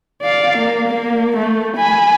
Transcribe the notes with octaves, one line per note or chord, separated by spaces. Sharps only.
D5 F5
A#3
A#3
A3
G#5 B5